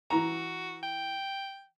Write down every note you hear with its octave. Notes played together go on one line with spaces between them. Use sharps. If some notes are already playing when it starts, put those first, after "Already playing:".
E3 F#4 A#5
G5